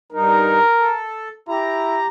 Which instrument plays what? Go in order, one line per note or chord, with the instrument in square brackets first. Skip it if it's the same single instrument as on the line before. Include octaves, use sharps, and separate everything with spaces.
[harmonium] G2 D#4 [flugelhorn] A#4
[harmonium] A4
[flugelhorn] E4 [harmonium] G4 A#5